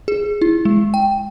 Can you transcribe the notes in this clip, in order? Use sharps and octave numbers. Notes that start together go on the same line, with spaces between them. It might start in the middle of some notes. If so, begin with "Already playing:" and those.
G#4
E4
G#3
G5